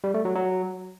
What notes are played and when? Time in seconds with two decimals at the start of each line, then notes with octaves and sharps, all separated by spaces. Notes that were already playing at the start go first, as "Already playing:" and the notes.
0.04 G3
0.14 A3
0.25 F#3
0.36 F#3